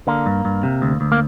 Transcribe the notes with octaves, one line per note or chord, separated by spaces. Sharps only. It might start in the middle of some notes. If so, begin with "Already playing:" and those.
D3 A#3
G2
G2
C3
D2
D2
A#3